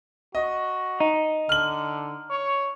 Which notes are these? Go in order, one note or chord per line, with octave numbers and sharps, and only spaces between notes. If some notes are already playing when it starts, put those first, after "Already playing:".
F#4 D#5
D#4
D3 F6 F#7
C#5